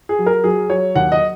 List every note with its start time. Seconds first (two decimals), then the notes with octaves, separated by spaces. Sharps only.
0.09 G#4
0.19 F#3
0.26 A#4
0.44 F#3 G#4
0.70 F#3 C#5
0.95 D#2 F#5
1.12 D#5